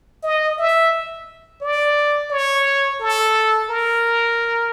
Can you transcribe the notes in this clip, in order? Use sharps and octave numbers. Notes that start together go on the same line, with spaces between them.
D#5
E5
D5
C#5
A4
A#4